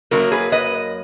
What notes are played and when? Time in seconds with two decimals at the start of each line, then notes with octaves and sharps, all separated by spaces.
0.11 F#2 D#3 F#3 A#3 F#4 A#4
0.32 G#4 B4
0.52 B4 D#5